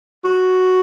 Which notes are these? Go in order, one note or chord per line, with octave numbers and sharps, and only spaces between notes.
F#4